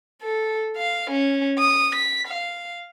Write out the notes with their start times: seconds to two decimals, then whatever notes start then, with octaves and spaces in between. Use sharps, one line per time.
0.22 A4
0.77 F5
1.10 C#4
1.58 D#6
1.95 B6
2.28 F5